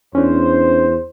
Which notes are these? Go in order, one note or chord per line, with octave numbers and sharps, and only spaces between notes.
E2 C#4 D4 C5